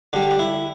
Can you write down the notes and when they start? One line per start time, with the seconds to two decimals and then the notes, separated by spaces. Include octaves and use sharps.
0.13 D3 G3 D4
0.31 D4
0.39 E4